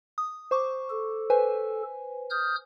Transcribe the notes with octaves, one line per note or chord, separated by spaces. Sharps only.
D#6
C5 C#6 D6
A4
B4 C5 G#5
D#6 F6 G6